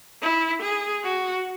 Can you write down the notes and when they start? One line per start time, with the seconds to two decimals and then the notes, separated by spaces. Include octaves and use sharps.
0.22 E4
0.62 G#4
1.03 F#4